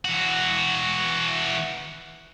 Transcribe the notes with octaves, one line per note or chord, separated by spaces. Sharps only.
E3 F#4